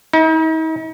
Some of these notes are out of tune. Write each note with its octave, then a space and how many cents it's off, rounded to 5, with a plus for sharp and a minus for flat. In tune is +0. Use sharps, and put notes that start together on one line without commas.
D#4 +45